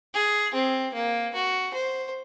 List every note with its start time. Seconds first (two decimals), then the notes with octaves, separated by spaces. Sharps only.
0.14 G#4
0.54 C4
0.94 A#3
1.34 F#4
1.74 C5